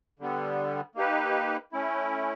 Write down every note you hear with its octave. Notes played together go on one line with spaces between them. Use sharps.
D3 G3 B3
A#3 D#4 G4 B4
A3 C#4 E4